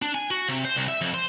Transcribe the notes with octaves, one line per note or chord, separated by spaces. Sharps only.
D4
G#5
F#4
C3
C5
C2
E5
F2
C5